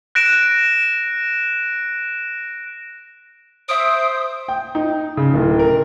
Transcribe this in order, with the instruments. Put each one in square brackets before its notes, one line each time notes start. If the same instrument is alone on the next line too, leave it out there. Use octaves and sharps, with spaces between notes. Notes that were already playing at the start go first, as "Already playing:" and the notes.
[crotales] F#6 A#6 D7 E7
[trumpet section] C5 [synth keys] E5 D7 [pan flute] D#6
[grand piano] G5
D#4
C#3
D1
A#4